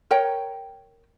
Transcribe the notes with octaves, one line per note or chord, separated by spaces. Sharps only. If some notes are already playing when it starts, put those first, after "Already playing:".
A#4 C#5 G5